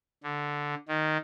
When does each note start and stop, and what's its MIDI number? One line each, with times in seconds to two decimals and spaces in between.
0.23 0.75 50
0.88 1.18 51